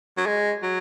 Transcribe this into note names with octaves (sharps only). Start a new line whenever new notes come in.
F#3
G#3
F#3